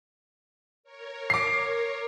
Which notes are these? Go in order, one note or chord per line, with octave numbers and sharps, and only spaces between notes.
A#4 C#5
D6 C7